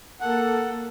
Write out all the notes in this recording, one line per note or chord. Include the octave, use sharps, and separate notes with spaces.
A#3 A4 F#5